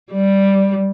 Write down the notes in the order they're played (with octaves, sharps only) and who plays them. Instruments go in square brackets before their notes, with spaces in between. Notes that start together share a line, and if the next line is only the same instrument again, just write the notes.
[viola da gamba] G3